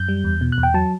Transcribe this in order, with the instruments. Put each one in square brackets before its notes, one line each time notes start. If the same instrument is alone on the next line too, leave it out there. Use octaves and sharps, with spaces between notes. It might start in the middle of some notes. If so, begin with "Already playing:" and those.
Already playing: [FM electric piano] F#2 G6
G3
E2
B2
F#6
E2
G5
F#3 A5